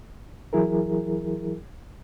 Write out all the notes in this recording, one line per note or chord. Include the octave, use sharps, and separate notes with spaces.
E3 F#3 E4 G#4 A#4